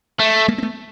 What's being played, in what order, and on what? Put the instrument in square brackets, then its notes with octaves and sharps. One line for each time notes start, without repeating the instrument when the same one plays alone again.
[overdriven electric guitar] A3
[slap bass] G#3 A#3
C4
A3 B3